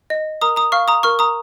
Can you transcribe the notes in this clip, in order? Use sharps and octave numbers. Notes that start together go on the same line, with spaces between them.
D#5
A#4 A#5 D#6
A#5 D#6
F5 C#6 F6
A#5 D#6
A#4 C#6 F6
A#5 D#6